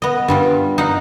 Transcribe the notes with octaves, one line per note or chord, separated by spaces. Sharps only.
B3 D#5
G2 G3 F4
D#4 F5 F#5